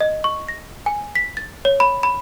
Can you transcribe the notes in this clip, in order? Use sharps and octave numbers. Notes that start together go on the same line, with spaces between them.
D#5
C#6
A#6
G#5
B6
A6
C#5
B5
B5